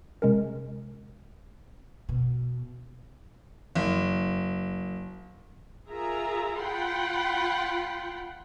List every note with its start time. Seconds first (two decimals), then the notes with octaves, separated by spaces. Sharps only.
0.22 C3 G#3 C#4 A#4
2.09 B2
3.75 F#1
5.88 F4 G#4 A#4 E5 A#5
6.60 F4 F#5 G5 B5 C6